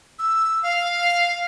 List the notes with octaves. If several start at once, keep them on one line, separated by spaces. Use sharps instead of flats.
E6
F5